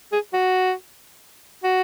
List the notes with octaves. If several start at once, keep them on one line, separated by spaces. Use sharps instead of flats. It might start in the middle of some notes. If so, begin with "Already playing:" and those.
G#4
F#4
F#4